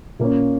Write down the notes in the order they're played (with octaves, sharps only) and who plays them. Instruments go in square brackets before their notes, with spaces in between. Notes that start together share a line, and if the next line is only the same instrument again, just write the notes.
[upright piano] A#2 A#3 C#4